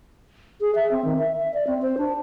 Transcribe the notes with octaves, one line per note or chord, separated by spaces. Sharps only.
G#4
E5
C4
D#3
E5
E5
D5
C4
C5
D4